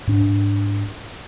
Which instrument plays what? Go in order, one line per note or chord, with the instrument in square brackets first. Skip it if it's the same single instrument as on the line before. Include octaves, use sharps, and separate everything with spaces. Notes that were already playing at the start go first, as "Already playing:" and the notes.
[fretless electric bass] G#2 D4